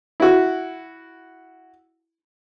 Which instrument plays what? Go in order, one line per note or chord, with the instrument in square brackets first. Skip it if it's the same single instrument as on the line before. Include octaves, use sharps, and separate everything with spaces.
[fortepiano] E4 F#4